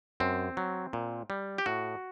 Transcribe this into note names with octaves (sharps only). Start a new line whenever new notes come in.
F#2 C4
F#3
A#2
G3
G4
A2 F#4